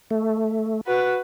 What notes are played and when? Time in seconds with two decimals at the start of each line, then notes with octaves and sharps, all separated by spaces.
0.11 A3
0.86 F#4 B4